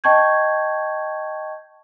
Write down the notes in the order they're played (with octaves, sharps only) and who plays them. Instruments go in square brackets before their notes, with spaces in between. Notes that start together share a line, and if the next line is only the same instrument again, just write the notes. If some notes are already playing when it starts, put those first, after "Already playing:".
[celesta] D#5 G5 A5 C#6 G6 G#6